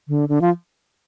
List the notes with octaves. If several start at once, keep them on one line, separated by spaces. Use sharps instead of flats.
D3
D3
F3